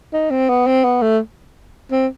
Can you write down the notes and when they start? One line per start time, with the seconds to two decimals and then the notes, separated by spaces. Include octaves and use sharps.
0.13 D#4
0.30 C4
0.49 B3
0.66 C4
0.84 B3
1.02 A3
1.91 C4